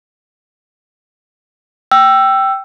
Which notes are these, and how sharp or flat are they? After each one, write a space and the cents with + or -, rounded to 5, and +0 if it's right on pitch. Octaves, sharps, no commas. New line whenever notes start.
G5 -10 E6 +15